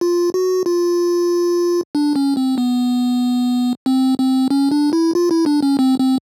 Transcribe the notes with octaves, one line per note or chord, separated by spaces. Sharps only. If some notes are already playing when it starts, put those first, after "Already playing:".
F4
F#4
F4
D4
C#4
C4
B3
C4
C4
C#4
D4
E4
F4
E4
D4
C#4
C4
C4